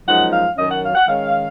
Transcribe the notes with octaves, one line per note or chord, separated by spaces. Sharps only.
F#2 F3 G#3 D#4 F#5
F5
F#2 D#3 F#3 C#4 D#5
F#5
F5
F#5
D#3 G#3 C#4 F5